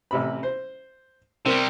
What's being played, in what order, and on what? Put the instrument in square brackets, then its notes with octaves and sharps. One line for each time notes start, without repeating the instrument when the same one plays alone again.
[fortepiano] A1 C3 B5
C5
[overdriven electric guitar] C3 G3 [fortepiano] C4 A#4